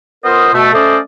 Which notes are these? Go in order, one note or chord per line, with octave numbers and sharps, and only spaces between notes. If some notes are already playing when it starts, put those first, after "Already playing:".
B3 F4 A#4 C5 D#5
B2 A3
A3 C#4 A4 C5 D5 D#5